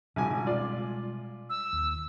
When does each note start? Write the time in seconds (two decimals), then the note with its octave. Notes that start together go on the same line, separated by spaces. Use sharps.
0.16 G#1 C#2 B2 G3 G#3 G#5
0.46 F4 D5
1.50 E6
1.73 D#2